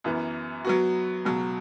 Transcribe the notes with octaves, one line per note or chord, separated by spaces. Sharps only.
F#2 E3 B3
F#3 B3 F#4
C#2 B2 F#3